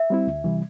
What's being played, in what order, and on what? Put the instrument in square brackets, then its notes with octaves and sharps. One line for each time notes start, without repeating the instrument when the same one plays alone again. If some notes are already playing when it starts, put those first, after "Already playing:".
Already playing: [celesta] E5
[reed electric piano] G3 C4 E4
D2
C3 E3 G3